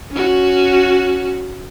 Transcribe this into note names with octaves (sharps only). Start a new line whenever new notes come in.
C#4 F#4